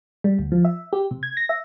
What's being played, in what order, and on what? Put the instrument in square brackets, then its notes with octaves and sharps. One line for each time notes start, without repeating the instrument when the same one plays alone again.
[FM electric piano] G3
D2
F3
E5
G4
C3
G#6
A#6
E5